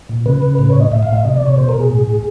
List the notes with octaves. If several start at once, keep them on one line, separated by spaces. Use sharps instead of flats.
A#2
C#3 B4
C#3
A2 B4
C#5
A2
D#5
A2 E5
F5
A2 E5
C3 D#5
D5
C3
C#5
B2 C5
A#4
B2
G#4
A2
A2